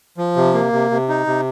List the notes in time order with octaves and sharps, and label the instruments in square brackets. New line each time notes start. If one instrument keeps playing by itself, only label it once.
[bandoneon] F3
C3
A#3
C3
C3
D#4
C3